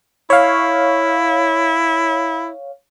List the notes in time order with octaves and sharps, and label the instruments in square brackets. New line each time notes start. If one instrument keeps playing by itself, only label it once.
[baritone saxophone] E4 [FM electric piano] C#5 F5